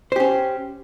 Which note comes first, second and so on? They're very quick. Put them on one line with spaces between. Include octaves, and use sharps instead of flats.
C5 G4 C#4